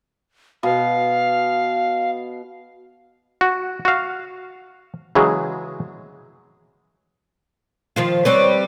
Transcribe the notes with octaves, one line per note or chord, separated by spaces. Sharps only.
B2 F5
F#4
F#4 F5
C#3 E3 F#3 G#3 G#4
D#3 F3 F4
G3 C4 B4 C#5